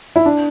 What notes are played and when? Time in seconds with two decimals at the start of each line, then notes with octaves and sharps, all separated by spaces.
0.16 E4
0.26 D4